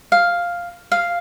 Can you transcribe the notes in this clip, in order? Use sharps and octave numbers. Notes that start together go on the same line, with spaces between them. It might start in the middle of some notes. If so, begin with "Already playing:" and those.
F5
F5